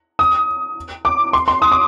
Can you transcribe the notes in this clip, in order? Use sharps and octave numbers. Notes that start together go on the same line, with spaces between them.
D#6
D6
C6
C6
D#6
D6